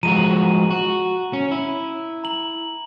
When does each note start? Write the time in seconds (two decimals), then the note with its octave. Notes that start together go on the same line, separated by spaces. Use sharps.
0.03 F3 G#3 F#4 A#5 D#7
0.71 F#4
1.33 C#4
1.51 E4
2.24 A#5 F#7